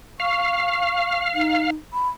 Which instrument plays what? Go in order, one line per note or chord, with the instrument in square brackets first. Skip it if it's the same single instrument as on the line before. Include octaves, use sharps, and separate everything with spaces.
[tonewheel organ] F5 [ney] C#6
[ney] D#4
B5